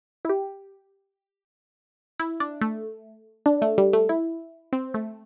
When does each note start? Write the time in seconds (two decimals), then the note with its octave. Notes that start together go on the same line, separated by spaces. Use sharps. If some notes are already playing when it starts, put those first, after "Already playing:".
0.25 E4
0.29 G4
2.20 E4
2.40 D4
2.61 A3
3.46 D4
3.62 A3
3.78 G3
3.93 A3
4.09 E4
4.73 C4
4.94 A3